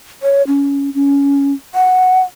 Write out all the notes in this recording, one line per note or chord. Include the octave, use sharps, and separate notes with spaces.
C#5
C#4
C#4
F#5